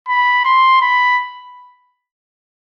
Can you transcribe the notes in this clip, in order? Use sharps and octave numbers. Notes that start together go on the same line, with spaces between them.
B5
C6
B5